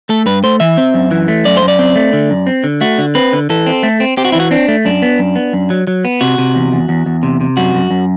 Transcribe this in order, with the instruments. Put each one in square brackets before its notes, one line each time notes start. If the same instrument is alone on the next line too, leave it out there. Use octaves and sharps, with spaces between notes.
[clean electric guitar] A3 A4
G2 B4
A3 C5
E3 E5
C4
F#2
E3
A3
F#2 D5
C5
F#2
D5
C4
A3
D3
F#2
C4
D3
A3 F#4
D3
C4 B4
D3
E3 A4
C4
A3
C4
C4 G4
F#4
E3 E4
F#4
C4 D4
A3
F#2 D4
B3
F#2
B3
F#2
F#3
F#3
B3
C3 F#4
C3
E2
E2
E2
E2
C3
C3
F#2 F#4
F#2
F#2